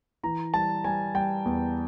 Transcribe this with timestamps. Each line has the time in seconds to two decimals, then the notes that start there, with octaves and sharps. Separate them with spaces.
0.23 E3 A#5
0.54 G3 A5
0.84 G3 G#5
1.14 G3 G5
1.45 E2